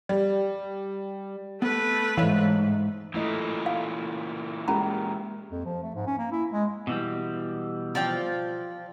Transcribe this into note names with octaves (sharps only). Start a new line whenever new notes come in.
G3
A3 B3 B4
G#2 E3 C#5 E5 F5
A#2 E3 A3 E4 D#5
F5
G#3 C#4 G4 A#4 A#5 B5
F2
F3
A3
G#2
C#4
A#3
E4
G#3
B2 E3 G3
F3 D5 G5